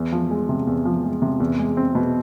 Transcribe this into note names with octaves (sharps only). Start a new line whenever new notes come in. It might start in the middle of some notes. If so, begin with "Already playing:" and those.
Already playing: E2
F3
G#3
C3
E2
F3
G#3
C3
E2
G#3
C4
B2